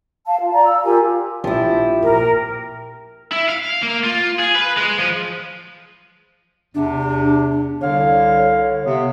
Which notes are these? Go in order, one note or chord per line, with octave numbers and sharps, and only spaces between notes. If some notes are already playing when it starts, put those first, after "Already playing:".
F5 A5
F4
D5 A#5
F5 E6
F4 G4 A#4 G#5
A#1 F3 E4 G4
A#2 A#4
E4
F5
A#3
F4
G#4
B4
G#3
F3
E2 C3 D4
C2 D3 C#5 F5
C3 B3